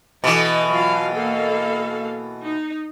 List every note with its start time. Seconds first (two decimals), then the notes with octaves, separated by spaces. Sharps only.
0.24 B2 E3 A4 D#5
0.69 F#3 F4 F5
1.15 A#3 A4 F5
2.45 D#4